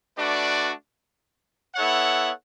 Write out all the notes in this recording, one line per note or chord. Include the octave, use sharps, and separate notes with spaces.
A3 D4 F#4 B4 D5
B3 E4 A4 C#5 F#5